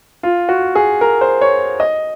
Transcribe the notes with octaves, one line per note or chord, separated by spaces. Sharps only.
F4
F#4
G#4
A#4
C5
C#5
D#5